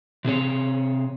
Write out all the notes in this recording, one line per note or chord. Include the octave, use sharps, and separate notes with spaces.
C3 C4 G#4 C#5